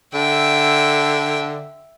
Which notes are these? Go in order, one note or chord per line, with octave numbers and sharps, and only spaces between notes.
D3 E5 G5